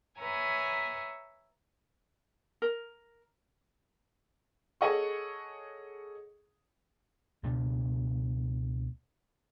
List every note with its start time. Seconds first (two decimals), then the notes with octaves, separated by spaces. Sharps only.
0.18 B4 C#5 E5 G#5 A#5
2.62 A#4
4.81 G#4 A4 C#5 D#5 F#5 C#6
7.43 C#2 B2 A3 D4